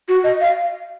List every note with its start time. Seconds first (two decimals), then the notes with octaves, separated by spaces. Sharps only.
0.08 F#4
0.24 D#5
0.41 F5